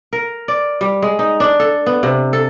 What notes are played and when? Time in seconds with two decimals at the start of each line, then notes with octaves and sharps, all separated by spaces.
0.13 A#4
0.48 D5
0.81 G3
1.02 G#3
1.19 D#4
1.40 D4
1.60 A4
1.86 B3
2.03 C3
2.33 A4